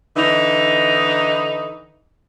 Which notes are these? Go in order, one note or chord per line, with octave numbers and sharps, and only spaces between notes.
D3 E3 D#4